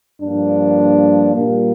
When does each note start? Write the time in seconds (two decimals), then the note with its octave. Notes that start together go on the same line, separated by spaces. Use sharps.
0.21 G2 F3 A#3 D4
1.34 A#2 G3 A#3